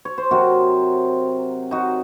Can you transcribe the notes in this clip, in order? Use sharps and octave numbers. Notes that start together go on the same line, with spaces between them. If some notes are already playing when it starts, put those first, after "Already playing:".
C#5
C5
C3 F#3 C4 F#4 A#4
D#4 F#4